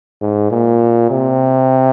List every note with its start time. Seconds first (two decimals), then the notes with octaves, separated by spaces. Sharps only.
0.22 G#2
0.51 A#2
1.10 C3